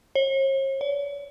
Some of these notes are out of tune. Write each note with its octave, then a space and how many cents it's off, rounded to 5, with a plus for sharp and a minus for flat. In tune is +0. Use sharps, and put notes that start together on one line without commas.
C#5 -45
C#5 +45